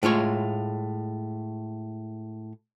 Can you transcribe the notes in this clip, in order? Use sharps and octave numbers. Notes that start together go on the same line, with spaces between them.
A2 G#3 F4 C#5